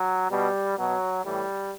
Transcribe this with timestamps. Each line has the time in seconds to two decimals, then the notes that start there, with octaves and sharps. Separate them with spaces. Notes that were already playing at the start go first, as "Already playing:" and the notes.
Already playing: F#3
0.31 B2 G3
0.78 B2 F#3
1.25 A2 E3 G3